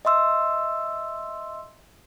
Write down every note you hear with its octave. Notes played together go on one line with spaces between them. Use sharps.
D#5 E5 C6 E6